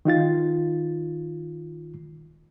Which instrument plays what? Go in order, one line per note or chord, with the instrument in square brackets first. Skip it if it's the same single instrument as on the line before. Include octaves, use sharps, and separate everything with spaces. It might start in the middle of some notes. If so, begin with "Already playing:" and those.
[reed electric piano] D#3 D#4 F4 A6